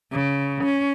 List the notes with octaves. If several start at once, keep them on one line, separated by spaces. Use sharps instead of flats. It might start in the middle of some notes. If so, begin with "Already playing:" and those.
C#3
C#4